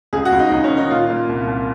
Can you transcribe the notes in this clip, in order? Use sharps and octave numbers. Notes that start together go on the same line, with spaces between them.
C#2 G#4
F#4
C#2
D#4
C#2 D#4
C#4
D#3
D#4
A#2 F4
A#2
C2
C2